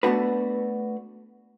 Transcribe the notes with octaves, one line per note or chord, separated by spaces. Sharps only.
A3 B3 D4 F#4 B4